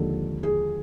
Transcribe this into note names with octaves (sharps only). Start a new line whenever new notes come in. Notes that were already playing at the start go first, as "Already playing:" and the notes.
Already playing: D#2 D3 F3 G#3 A4
G#4